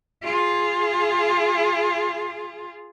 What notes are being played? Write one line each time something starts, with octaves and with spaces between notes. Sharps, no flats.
F4 G#4